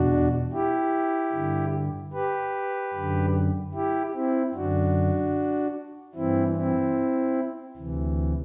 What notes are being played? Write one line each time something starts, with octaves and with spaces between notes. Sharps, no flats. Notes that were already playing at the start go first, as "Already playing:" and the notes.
Already playing: E2 B2 D4 F#4
E4 G4
G2 D3
G4 B4
F#2 D3
E4 G4
C4 E4
F#2 D3 D4 F#4
G2 E3 C4 E4
C4 E4
D2 C3 E3